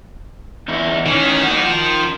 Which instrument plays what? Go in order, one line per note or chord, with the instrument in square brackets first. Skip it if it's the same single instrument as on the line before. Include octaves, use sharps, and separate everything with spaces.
[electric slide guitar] E2 D#4 E4
[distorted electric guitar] D#3 [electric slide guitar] E3 C#4
[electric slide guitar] A#3 F#4
F3